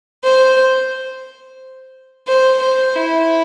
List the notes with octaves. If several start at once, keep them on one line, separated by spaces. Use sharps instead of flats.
C5
C5
C5
E4